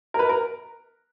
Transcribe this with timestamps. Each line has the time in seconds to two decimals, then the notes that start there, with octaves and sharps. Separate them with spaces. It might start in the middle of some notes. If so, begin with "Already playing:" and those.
0.14 A#4
0.19 B4
0.29 A#4